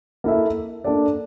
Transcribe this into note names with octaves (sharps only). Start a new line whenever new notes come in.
A#3 E4 A4 E5
A#3 D4 A4 D5